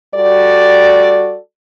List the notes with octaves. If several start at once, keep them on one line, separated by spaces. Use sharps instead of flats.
G3 F#4 A4 D5